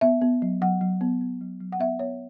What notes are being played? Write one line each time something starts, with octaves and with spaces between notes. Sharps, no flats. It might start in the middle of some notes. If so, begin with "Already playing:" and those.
B3 E5
B3
F#3
F#3 F#5
F#3
B3
B3
F#3
F#3
F#5
B3 E5
B3 C#5